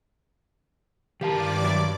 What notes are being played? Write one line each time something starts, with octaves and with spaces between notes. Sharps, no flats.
G2 D#3 G4 A#4 D5 F5 A5 D6
F#3 C#5 E5